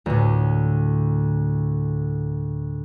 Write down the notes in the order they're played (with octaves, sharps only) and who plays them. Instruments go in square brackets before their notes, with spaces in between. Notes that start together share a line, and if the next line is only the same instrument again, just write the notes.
[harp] D2 A2